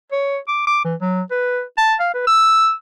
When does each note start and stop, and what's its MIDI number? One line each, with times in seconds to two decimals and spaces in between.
0.12 0.37 73
0.48 0.64 86
0.67 0.81 86
0.84 0.94 52
1.01 1.21 54
1.31 1.61 71
1.78 1.95 81
2.00 2.11 77
2.14 2.23 71
2.27 2.72 88